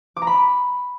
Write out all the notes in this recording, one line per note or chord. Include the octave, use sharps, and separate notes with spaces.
D6
A#5
B5